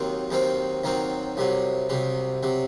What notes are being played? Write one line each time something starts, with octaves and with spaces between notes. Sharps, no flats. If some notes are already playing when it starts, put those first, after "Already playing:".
Already playing: D#2 D#3 F#3 C4
D#2 D#3 F#3 C4
D#2 D#3 F#3 C4
C2 C3 F#3
C2 C3 F#3
C3 F#3